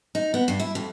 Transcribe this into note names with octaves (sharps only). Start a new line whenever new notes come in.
D#4
B3
G2
E4
F2